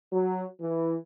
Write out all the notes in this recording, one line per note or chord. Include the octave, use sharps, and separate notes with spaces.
F#3
E3